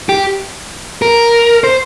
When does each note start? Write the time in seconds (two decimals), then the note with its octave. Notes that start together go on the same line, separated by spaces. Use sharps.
0.09 G4
1.02 A#4
1.64 C5